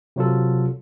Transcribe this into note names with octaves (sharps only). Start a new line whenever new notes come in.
C3 F#3 F4 A4